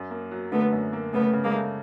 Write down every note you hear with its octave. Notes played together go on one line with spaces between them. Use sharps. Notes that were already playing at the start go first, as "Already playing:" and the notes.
Already playing: F#2
A#3
F#3
D3 A3 B3
F#2
A#3
C#3 A3 B3
C#3
G#3 A#3
A3